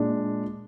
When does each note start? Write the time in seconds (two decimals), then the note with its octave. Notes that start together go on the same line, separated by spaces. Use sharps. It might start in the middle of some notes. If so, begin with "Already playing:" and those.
Already playing: A#2 G#3 D4